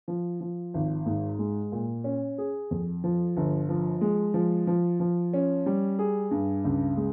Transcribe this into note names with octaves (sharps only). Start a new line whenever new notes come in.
F3
F3
G#1
G#2
G#3
A#2
C#4
G#4
F2
F3
G1
F3
G#3
F3
F3
F3
C#4
G3
G#4
G2
C#2
G#3